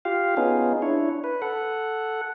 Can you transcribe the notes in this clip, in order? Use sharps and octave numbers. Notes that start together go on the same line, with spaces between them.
F4 G4 F5
B3 C#4 D#4 F4 G#4
D4 E4 C#5
B4
A4 F#5